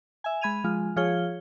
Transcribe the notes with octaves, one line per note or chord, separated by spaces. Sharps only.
E5 G#5
G#3 B5 G#6 D#7 F7
F3 G#3 F4
F3 F4 G#4 C#5 G7